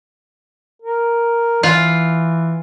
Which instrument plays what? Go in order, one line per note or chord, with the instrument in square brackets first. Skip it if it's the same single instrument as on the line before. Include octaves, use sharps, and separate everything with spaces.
[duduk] A#4
[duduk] E3 [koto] F4